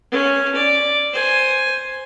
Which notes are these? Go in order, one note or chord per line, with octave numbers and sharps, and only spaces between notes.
C#4
D5
C5 G#5